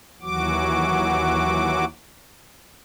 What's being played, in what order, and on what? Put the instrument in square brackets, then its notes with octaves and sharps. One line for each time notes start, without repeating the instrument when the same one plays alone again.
[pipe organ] D#2 E3 F#3 F#4 D6